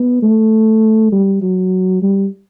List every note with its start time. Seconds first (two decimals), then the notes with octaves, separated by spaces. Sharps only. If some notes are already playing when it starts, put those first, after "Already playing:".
Already playing: B3
0.22 A3
1.12 G3
1.42 F#3
2.02 G3